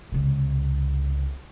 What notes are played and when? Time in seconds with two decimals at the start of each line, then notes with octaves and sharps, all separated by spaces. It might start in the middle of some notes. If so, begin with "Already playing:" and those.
0.12 C#2 C3